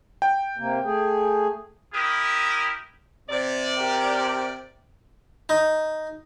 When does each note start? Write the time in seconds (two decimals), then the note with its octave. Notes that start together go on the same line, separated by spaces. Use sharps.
0.22 G5
0.57 C3 A#3
0.84 A3 G#4
1.94 E4 G4 A#4 D#6
3.30 C3 D5
3.76 G4 A#4
5.49 D#4